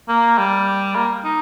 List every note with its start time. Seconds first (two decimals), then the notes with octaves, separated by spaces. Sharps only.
0.09 A#3
0.38 G3
0.96 A#3
1.25 D#4